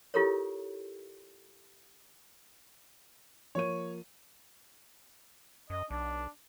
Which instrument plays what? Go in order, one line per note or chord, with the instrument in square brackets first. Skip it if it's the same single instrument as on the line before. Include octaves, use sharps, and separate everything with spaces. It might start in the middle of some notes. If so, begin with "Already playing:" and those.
[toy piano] E4 F4 G4 A4 A#4 C#5
[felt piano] F3 A#3 D#7 [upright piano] C#5
[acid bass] F#2 [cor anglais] D#5
[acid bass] B1 [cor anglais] D4